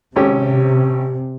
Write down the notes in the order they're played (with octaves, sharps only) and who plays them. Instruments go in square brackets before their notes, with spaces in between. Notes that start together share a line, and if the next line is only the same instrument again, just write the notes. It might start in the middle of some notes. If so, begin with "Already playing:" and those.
[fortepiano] G#1 C#4 G4 [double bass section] C3